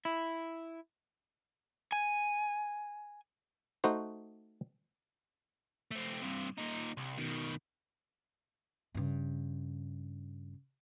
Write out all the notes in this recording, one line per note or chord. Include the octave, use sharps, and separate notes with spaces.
E4
G#5
A3 D#4 F#4 C5
A3 C4
G2 C3
A#2 D#4
C2
B2 D#3
G2 C#3